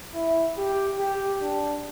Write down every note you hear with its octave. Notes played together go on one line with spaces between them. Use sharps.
E4
G4
G4
D4